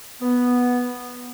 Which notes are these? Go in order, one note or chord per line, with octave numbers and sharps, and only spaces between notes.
B3